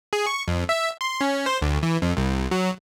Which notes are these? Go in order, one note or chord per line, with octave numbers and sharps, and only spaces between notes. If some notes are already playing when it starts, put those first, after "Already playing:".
G#4
C#6
F2
E5
C6
C#4
C5
D2
E3
F2
C2
F#3